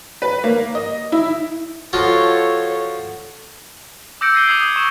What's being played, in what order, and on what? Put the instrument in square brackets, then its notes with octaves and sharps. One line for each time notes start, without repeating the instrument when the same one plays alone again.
[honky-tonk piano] B4
A#3
D#5
E4
[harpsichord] F3 F4 F#4 [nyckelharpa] A4 C#5
[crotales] D6 E6 G6 A#6 C#7 D7
G#6 C7 D#7 G7
D6 D#6 G#6 C7 F#7
C#6 E7